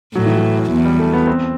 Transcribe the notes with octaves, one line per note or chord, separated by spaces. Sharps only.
A2 F#3
E3
F#3
E2
G3
A3
B3
C4